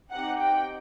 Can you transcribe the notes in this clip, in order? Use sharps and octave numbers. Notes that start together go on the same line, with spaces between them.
C4 D#4 G4 F#5
G5